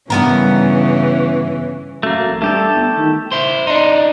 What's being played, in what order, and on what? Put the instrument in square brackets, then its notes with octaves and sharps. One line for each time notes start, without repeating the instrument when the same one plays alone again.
[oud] G2 B3 A#4 [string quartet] C#3 E3
[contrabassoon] F#2 [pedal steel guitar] A3 A#3
[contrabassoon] A1
[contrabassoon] G2 [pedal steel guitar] A3 G4 A4
[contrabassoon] G1
D#3
[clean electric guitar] E4 C5
D4 D#4